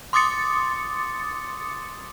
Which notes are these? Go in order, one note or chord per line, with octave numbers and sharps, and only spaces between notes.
C6 D6 D#6 A6 C#7